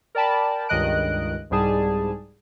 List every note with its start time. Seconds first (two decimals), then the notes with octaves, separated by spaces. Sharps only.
0.15 A#4 D5 G5 A5 B5
0.69 C#2 G2 D#3 D#5 F#6 D7
1.50 C2 G#2 G3 G#4 A5